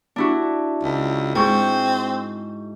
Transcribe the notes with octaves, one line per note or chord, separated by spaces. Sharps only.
D4 E4 F#4
C#2
G#2 C4 C#6 G6